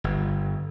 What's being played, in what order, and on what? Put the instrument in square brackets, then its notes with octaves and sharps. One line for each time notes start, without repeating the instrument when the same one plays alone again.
[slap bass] G1